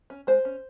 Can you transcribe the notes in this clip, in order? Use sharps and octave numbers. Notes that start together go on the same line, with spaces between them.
C#4
G#3 C5
C#4